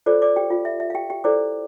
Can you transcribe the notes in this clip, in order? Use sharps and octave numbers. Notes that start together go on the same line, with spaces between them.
F4 A4 C5 D5 D6
D5 D6
G4 G5
F4 F5
E5
E5
F5
G4 G5
G4 G5
E4 A4 C5 D5 D6